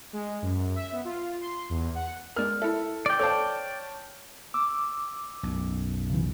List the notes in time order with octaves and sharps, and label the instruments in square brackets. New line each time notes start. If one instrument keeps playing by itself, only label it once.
[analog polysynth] G#3
F#2
E5
B3
F4
C6
E2
F#5
[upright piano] G#3 F6 [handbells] A#4 D5
[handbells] E4 E5 [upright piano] A4
[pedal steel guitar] D5 G5
[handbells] A4 C5 F5 [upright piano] C#5 A5
[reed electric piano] D6 E6
[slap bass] B1 F#2
[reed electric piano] C#3 E3